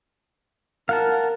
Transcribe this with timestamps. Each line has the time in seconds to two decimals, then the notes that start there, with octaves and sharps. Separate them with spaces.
0.89 A#4 F5 F#5 A5